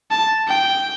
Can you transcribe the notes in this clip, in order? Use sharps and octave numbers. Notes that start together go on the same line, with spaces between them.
A5
G5